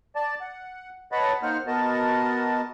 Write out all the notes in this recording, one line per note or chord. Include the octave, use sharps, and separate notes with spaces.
D5 A5
F#5
B4 C#5 D#5 F#5 A5 B5
A#3 D#4 C5 F#5 F6
B3 F#4 A#4 D#5 A5